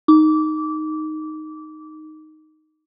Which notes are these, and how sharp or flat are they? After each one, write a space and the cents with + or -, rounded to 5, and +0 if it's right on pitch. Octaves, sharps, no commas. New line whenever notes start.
D#4 +0 D6 -20